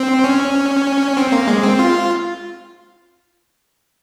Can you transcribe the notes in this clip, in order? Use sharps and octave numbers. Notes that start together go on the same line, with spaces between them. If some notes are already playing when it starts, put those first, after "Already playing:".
Already playing: C4
C#4
C4
A#3
G#3
C4
F4